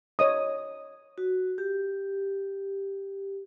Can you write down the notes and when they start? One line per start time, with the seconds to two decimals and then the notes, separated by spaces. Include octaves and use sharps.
0.19 C#5 D#5 D#6
1.18 F#4
1.58 G4